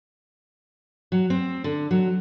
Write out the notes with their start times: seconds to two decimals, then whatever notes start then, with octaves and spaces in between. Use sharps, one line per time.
1.12 F#3
1.30 C4
1.64 D3
1.91 F#3